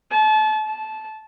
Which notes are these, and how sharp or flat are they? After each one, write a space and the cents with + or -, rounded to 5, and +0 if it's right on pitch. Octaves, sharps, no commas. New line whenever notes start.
A5 -30
A5 -15